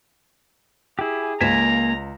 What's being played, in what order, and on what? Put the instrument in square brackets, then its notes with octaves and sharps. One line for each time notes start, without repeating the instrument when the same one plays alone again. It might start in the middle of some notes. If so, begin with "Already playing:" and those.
[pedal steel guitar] E4 G4 [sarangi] G#4
[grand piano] C#2 B6 E7 [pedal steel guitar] A#3 G#5 [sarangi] A#5